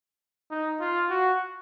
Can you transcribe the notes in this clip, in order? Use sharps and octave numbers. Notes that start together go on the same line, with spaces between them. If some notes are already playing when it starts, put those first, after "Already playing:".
D#4
F4
F#4